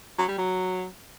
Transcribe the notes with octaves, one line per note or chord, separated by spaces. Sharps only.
F#3
G3
F#3